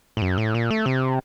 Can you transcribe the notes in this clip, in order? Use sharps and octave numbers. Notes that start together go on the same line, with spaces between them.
A2
F#2
A2
A#2
A3
C3